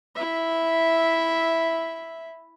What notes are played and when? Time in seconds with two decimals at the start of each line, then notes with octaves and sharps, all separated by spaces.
0.15 E4 E5